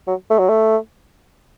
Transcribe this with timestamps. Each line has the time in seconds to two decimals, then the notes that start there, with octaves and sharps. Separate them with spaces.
0.08 F#3
0.30 A3
0.39 F#3
0.49 A3